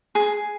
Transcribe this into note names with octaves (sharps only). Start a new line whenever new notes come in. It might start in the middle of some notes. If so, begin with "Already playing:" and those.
G#4